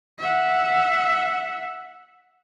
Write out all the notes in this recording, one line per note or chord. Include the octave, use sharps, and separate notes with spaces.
E5 F#5